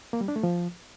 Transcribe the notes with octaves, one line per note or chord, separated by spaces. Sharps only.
A#3
G3
D4
A3
F3